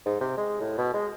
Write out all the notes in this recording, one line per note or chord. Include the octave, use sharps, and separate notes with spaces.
G#2
C3
G#3
A2
B2
G#3